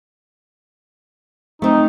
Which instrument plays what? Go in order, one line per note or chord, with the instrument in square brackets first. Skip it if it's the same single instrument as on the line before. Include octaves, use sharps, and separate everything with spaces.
[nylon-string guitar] A3 C4 [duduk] D#4